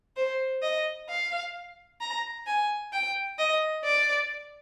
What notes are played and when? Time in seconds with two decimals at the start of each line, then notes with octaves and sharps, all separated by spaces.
0.17 C5
0.62 D#5
1.09 F5
2.01 A#5
2.47 G#5
2.93 G5
3.39 D#5
3.85 D5